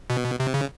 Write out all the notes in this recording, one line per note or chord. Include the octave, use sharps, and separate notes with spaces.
B2
C3
C#3